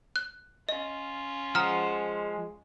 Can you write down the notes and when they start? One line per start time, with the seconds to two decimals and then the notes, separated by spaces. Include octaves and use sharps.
0.16 F#6
0.69 C#4 F4 D#5
1.55 F3 G#3 F#5 A#5 D#6 F6